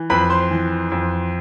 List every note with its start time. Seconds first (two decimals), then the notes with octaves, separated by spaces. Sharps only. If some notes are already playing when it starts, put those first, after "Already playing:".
Already playing: E3
0.10 F2 B4 B5
0.30 C5 C6
0.51 E3
0.92 F2